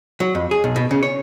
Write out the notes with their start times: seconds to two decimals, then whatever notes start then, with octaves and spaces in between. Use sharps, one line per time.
0.20 F#3
0.35 F2
0.51 G#4
0.64 B1
0.76 B2
0.91 C#3
1.03 C#5